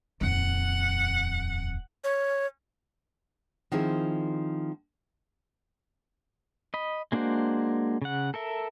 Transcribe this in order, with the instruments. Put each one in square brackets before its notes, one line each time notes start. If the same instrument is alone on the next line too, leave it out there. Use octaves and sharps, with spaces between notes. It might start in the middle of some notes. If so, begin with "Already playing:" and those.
[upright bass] D#1 F2 [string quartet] F#5
[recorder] C#5
[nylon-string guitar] D#3 F3 C4 E4 G#4
[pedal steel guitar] D#5 B5
G#3 A#3 D4 F#4 C5
C#3 F#5
A4 A#4 E5